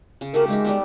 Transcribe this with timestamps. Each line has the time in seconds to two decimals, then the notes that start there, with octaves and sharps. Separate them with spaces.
0.21 C#3
0.34 A3 F#4 G4 A#4
0.48 G#3 A#3 D#4 E5
0.64 G3 A3 B3